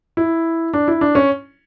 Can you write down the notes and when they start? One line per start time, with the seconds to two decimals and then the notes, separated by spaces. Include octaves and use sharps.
0.17 E4
0.74 D4
0.88 E4
1.01 D4
1.15 C#4